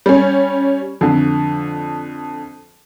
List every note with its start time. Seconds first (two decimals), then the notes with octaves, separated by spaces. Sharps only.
0.06 G3 C#4
1.01 F2 D3